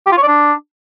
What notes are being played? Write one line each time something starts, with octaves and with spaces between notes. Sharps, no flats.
G4
F4
C#5
D5
D4